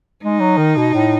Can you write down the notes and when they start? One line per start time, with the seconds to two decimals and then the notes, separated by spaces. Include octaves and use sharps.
0.23 G#3 D#4
0.41 F#3
0.58 D#3
0.77 B2
0.94 A2